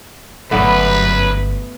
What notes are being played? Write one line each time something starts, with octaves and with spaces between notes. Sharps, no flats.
G1 F#2 A3 B3 B4 D5